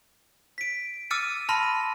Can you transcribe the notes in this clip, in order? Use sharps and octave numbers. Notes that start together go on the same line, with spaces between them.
B6 D7
D6 E6 F6 A6 C#7 D#7
A5 B5 C6 F6 A#6 D#7